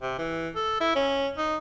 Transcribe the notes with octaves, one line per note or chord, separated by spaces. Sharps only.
C3
E3
A4
E4
C#4
D#4